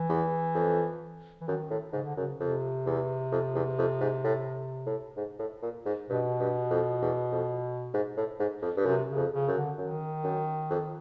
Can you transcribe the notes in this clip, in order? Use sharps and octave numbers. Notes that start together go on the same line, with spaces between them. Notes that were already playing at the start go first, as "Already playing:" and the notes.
Already playing: E3
E2
F2
E3
F#2 D#3
A2
G#2 C#3
D3
F#2 C#3
F2 C3
E2
F2
E2
F2
G#2
A2
A2
G#2
A2
A#2
G#2
G2 B2
G2
F2
E2
F2
G#2
A2
G#2
F2
G2
F#2 C3
C#3
F2
C#3
F#2
D3
F#2 D#3
F#2
F2